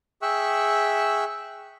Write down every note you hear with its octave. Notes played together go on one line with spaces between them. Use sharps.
G#4 E5 G5 C#6 E6 F#6